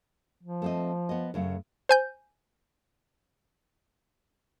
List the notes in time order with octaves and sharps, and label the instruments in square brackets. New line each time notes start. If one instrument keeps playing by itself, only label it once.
[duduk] F3
[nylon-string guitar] A3 C4 D#5
B3 D#5
F#2 C#3 A3
[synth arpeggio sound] C5 G#5 G6